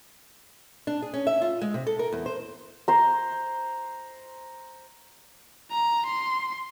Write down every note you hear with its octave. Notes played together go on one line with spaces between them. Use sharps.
D4
G#4
C#4
E5
F4
G#3
C3
A4
A#4
E2
C5
C5 A#5
A#5
C6